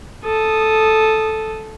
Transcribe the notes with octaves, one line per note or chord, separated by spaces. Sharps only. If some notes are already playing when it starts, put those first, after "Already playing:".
A4 D#6